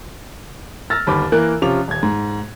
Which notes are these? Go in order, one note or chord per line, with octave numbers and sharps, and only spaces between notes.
E6 F6 A6 A#6
G1 D#2 B5 D6
E3 A#3 A#4 F#6
C3 F3 C#4 F4 D6 F7
D#1 G#6
G#2